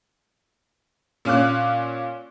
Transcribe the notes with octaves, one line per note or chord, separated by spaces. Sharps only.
A#2 C#4 F5 D6 F#6